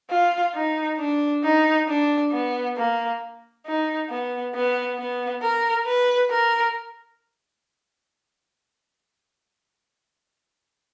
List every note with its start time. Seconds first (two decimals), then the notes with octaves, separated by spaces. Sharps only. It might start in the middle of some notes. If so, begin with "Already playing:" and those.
0.10 F4
0.55 D#4
0.99 D4
1.44 D#4
1.89 D4
2.32 B3
2.77 A#3
3.66 D#4
4.10 B3
4.55 B3
4.99 B3
5.42 A#4
5.87 B4
6.31 A#4